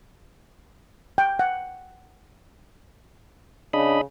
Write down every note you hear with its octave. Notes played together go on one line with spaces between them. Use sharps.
G5
F#5
C#3 D4 D#5 B5